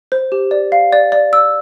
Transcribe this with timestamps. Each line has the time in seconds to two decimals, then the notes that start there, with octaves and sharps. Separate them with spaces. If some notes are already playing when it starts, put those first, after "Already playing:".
0.12 C5
0.32 G4
0.51 D5
0.72 F5
0.93 D5
1.12 D5
1.33 E6